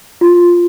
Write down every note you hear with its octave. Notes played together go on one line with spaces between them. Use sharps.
F4